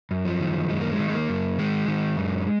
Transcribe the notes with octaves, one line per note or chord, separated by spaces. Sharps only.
F#2
F3
D#3
F#2 G#3
A#3
G#3
D#3
G#3
A#3
F#2
D#3 G#3
D#3
F#2